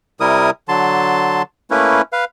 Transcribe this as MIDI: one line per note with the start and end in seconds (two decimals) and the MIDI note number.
0.20 0.50 48
0.20 0.50 55
0.20 0.50 64
0.20 0.50 70
0.20 0.50 87
0.69 1.42 50
0.69 1.42 54
0.69 1.42 81
0.69 1.42 84
1.71 2.02 57
1.71 2.02 58
1.71 2.02 61
1.71 2.02 64
1.71 2.02 71
2.13 2.25 71
2.13 2.25 77